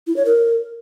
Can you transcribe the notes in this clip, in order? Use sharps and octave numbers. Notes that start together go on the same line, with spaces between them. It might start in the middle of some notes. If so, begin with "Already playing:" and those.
E4
C#5
A#4